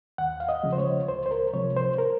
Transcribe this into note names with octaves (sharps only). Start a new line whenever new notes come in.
D#2 F#5
F5
D#5
C#3 F3 G#3
C5
C#5
C#2 C5
C5
A#4
C3 F3 G#3 C#5
C5
A#4